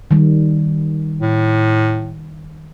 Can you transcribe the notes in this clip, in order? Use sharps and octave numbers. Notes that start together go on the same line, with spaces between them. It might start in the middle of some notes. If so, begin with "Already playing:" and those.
D#3 G3
A2